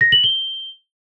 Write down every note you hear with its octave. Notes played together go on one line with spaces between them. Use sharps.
A#6
F#7
G7